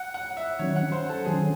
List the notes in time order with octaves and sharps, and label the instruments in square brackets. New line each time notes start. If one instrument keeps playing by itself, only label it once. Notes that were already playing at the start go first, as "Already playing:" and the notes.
Already playing: [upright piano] F#5
F#5
E5
[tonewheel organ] D#3 F#3 C#4 [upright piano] C#5
[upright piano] F#5
C5
A4
[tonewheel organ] D#3 F#3 C#4 [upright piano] G#4